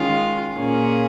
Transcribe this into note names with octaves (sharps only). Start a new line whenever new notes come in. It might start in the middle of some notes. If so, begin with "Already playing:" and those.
Already playing: D#3 G#3 C#4 F4
A#2 A#3 C#4 G#4